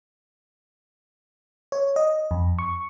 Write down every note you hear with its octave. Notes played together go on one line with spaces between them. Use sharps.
C#5
D#5
F2
C#6